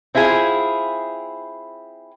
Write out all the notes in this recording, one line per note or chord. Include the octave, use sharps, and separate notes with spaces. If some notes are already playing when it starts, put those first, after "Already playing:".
C4 E4 F4 G#4